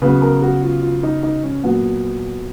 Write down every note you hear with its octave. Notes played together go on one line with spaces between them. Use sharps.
C#3 F#3 B3 B4
A#4
F#4
F4
F4
D#4
D#4
C#4
A#2 F#3 B3